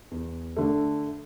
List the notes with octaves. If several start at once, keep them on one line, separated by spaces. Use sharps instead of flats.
E2
D3 A3